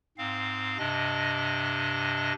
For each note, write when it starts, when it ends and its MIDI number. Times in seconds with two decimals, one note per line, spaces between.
0.18 0.78 44
0.18 0.78 60
0.18 0.78 77
0.78 2.33 43
0.78 2.33 48
0.78 2.33 62
0.78 2.33 75
0.78 2.33 94